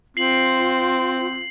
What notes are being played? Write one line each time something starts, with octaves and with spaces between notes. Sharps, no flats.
C4 F4 C7 F#7